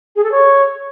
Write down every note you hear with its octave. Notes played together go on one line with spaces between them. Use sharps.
G#4
A4
C#5